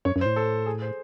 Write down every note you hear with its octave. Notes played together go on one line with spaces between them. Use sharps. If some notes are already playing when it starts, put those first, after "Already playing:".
F#2 C#5
F#2
C5
A2
A4
G#4
C5